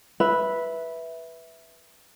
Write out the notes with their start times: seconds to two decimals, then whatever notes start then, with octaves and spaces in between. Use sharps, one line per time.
0.20 B4 E5